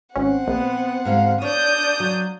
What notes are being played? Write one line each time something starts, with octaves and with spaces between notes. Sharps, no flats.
G#1 C4 C#4 F#5
A#1 B3
G#2 D3 G3 F5
D4 C#5 D#6 G6
F#3